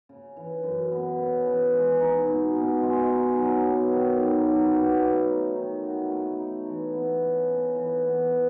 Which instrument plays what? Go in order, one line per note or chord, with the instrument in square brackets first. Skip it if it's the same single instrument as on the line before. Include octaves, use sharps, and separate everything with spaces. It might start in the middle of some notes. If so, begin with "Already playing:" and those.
[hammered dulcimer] C#3
E3
F#2
B3
C#3
E3
G#3
D#4
B2
B2
G#3
D#4
F#3
B3
D#3
D#3
F#3
B3
A3
D#4
D#3
F#4
A3
D#4
E3
B3
C#3
C#3
E3
B3
E3